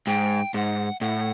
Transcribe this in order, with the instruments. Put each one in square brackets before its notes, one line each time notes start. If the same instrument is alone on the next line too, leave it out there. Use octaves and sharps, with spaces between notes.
[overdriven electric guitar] G#2 [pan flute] G5
[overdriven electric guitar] G#2 [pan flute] F#5
[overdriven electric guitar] A2 [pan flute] F#5